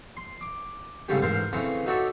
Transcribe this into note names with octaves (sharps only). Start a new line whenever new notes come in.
C6
D6
G#2 C#3 G3 A3 C4 G4
A1 G#2 A#4 C5 F5
C#3 E3 A3 C4
D#4 F#4 A4 C#5 D5 E5